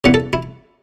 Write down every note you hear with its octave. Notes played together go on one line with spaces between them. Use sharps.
E2 C#3 E3 F#5
A4
E4